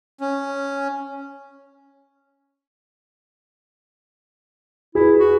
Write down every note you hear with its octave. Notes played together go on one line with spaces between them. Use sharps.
C#4
E4 G#4 B4
F#4